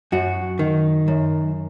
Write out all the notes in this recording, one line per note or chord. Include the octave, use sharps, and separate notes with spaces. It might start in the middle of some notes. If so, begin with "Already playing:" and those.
F#2 F#4
D#3
F#2